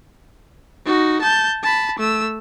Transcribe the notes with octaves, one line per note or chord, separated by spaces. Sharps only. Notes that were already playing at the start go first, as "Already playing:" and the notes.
D#4 F#4
A5 G6
A5 B5
A3 E6